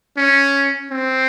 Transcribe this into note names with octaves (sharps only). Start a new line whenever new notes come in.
C#4
C4